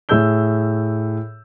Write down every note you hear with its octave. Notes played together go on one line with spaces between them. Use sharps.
A2 G#4 E6 G6 G7